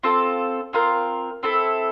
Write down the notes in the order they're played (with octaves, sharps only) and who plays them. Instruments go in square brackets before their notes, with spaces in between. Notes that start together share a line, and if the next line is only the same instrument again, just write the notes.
[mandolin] C4 F4 A4
C4 F4 A#4
C4 E4 A4